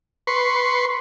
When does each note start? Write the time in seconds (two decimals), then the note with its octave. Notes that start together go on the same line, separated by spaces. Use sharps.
0.27 B4 C6 C#6